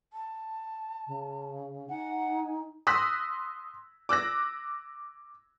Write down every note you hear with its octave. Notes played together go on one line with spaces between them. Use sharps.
A5
C#3
D#4 F#5 G#5
C6 D#6 E6 F#6 A#6 B6
D6 E6 F#6 A#6